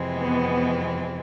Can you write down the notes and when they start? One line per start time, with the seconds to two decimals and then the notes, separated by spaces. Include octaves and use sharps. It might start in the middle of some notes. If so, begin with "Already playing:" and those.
Already playing: F2 C3 E3 G#3 C4
0.18 B3